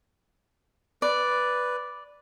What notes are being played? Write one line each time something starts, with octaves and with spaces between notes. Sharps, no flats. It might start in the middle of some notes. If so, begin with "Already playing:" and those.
B4 D5